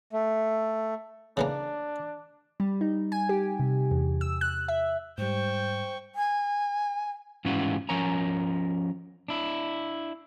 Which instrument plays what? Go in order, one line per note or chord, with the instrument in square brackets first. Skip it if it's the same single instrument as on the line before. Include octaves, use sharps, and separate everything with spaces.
[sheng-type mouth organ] A3
[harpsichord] C#3 E3 A#3 [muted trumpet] D4
[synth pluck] G3
D#4
G#5
G4
C3
E2
E6
F#6
E5
[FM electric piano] G#2 G3 [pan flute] C5 [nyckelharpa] G5 C#6
[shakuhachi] G#5
[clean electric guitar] G#2 E3 G3 C#4 F4 F#4
F3 C#4 A#4 C#5 G#5 A#5
D4 E4